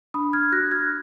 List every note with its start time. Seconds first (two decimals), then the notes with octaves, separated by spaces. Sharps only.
0.14 D4 B5 D#6
0.33 F6 G#6
0.52 F#4 F#6 A#6
0.71 F6 G#6